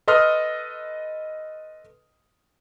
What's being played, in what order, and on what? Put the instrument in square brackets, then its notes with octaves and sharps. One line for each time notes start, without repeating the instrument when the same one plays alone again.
[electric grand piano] A4 B4 D#5 C6 D#6 F6